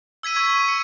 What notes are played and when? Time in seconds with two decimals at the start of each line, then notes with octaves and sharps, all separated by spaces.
0.23 E6 G#6 B6 D#7
0.36 C#6 G#6 B6 D#7
0.49 C#6
0.68 C#7